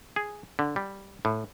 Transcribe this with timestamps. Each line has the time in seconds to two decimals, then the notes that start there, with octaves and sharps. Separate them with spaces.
0.16 G#4
0.59 D3
0.76 G3
1.25 A2